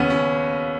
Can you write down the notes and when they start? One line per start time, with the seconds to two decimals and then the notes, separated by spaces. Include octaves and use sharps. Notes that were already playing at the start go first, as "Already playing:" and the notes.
Already playing: D#2 C#3 B3 C#4
0.10 C#4